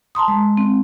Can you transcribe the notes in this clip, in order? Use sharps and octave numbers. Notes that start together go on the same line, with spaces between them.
A5 A#5 C6 D#6
G#3
C4